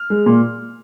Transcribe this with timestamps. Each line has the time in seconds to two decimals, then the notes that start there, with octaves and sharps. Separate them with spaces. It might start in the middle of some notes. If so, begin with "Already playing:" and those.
Already playing: F6
0.10 G#3
0.26 A#2